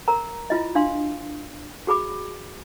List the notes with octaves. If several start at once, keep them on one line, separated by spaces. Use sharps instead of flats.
A#4 A#5
E4 F4 D#5
D4 F5 C6
F#4 G#4 B5 D6